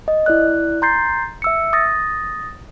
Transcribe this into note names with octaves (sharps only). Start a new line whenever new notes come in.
D#5
E4 D5 F#6
A#5 C6 G6 A6 C7
E5 E6 C#7
D#6 A6 A#6